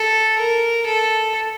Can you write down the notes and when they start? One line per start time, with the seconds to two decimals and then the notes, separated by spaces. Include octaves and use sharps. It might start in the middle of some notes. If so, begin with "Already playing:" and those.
Already playing: A4
0.39 A#4
0.86 A4